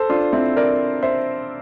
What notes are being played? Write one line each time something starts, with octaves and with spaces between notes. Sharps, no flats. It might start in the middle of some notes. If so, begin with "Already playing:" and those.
Already playing: A4 C5
D4 F4
C4 E4
A#4 D5
C5 E5